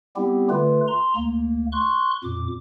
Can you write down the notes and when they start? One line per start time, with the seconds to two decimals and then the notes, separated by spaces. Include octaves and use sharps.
0.16 G3 B3 C4 E4 G4
0.50 D3 A3 F4 B4
0.88 A#5 C6
1.16 D2 A#3
1.72 C6 C#6 F#6
2.24 F2 A#2 D6